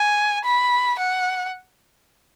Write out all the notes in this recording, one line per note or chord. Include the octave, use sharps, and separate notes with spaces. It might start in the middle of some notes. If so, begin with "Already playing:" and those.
Already playing: G#5
B5
F#5